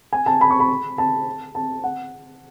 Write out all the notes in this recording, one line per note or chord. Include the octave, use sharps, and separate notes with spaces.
G#5
A5
B5
C#6
B5
A5
A5
F#5